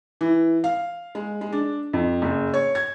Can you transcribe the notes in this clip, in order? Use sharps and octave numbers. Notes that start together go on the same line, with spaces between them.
E3
F5
G#3
G#3
D4
F2
F#1
C#5
G#6